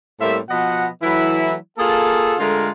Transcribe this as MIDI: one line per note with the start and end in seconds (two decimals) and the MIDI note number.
0.21 0.38 45
0.21 0.38 55
0.21 0.38 58
0.21 0.38 60
0.21 0.38 76
0.50 0.88 47
0.50 0.88 53
0.50 0.88 59
0.50 0.88 75
0.50 0.88 78
1.03 1.55 52
1.03 1.55 54
1.03 1.55 57
1.03 1.55 64
1.78 2.35 58
1.78 2.35 65
1.78 2.35 68
1.78 2.35 69
2.39 2.70 50
2.39 2.70 56
2.39 2.70 57
2.39 2.70 65
2.39 2.70 70